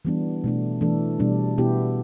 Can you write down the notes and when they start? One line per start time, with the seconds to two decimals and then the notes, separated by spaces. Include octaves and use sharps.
0.05 E3 G3 B3 D4
0.44 B2 A3 D4
0.81 E3 A3 D4 A4
1.20 B2 G3 D4
1.58 B2 B3 E4 G4